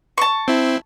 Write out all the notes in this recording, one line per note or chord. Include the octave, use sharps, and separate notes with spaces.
A5 C#6
C4 E4